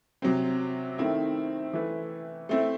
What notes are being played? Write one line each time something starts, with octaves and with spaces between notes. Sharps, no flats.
C3 F#3 C4
D#3 A3 C4 E4
E3 A3 E4 B4
A3 C4 E4